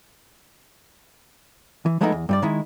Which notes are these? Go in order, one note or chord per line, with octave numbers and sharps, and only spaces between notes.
E3
F3 G#3 A3 B3 D#4 E4
E2
G2 G3 D5
D#3 G#3 E4